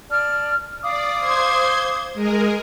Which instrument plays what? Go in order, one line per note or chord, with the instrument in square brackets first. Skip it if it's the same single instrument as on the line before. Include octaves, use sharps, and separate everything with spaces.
[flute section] D5 A5 F6
[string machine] D5 [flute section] F5 D6 D#6
[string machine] C5 C6 G#6
G#3 G#4 A#4